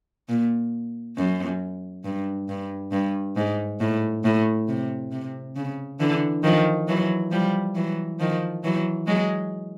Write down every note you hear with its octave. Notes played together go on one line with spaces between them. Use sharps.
A#2
F#2
G2
G2
G2
G#2
A2
A2
C3
C3
C#3
D3 E3
D#3 F3
E3 F#3
F3 G3
E3 F#3
D#3 F3
E3 F#3
F#3 G#3